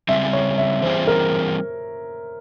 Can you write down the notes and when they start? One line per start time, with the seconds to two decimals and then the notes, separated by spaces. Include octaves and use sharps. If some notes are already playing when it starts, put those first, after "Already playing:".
0.08 C#3 G3 C4 E5
0.33 C#5
0.58 E5
0.82 E3 G3 C4 F4 G#4 C5
1.07 A#4